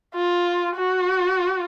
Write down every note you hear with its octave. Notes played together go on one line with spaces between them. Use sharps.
F4
F#4